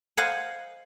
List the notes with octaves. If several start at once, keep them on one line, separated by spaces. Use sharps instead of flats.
C5 D#5 F5 F#5 G#5